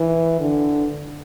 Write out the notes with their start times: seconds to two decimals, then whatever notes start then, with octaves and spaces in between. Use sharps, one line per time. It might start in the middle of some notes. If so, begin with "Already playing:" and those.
Already playing: E3
0.40 D3